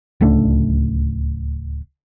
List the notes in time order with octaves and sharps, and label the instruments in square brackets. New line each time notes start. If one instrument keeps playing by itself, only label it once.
[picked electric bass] D1 C#2 A3 D4